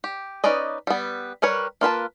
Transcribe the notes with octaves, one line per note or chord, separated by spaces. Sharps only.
G4
C#4 D#4 B4 D5 D#5
G3 B3
G3 A#4 B4 C#5
A#3 F4 B4 A5